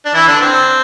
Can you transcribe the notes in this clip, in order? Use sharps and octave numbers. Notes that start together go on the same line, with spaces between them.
D4
E3 E4
D3 D4
C4